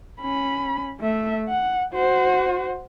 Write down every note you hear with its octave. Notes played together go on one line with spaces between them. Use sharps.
C#4 B5
A3 E5
F#5
F#4 C5